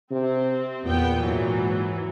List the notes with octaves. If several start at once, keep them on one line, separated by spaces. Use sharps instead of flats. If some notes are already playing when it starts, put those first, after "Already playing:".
C3 C4
E2 A#2 B3 G5
G#2 E3 F#3